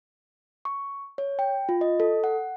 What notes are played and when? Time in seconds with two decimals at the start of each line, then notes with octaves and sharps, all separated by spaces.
0.65 C#6
1.18 C#5
1.39 G5
1.69 F4
1.81 D#5
2.00 A4
2.24 F#5